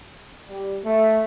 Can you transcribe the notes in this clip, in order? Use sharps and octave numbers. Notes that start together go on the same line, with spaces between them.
G3
A3